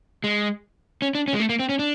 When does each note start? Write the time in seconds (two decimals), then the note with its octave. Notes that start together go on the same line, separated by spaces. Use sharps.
0.24 G#3
1.02 C#4
1.15 D4
1.28 C#4
1.34 G#3
1.40 A3
1.49 A#3
1.59 C4
1.69 C#4
1.79 D4